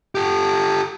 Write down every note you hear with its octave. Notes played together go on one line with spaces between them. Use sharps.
G4 A4